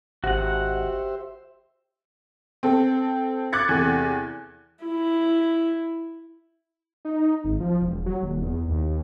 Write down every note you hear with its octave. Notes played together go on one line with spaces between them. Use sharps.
G#1 F#4 G4 C5 E5 F#5
C4 A4
D6 F#6 G#6 A6 C#7
E2 C3 A3
E4
D#4
G#1
F3
E1
F#3
D#1
E2
D#2